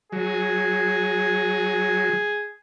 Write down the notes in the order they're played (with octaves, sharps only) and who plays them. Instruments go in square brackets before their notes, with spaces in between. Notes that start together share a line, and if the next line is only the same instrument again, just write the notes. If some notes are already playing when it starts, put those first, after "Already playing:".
[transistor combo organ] F#3 [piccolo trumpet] G#4